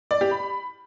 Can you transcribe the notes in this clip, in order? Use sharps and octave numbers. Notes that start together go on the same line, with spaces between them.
D5
G4
B5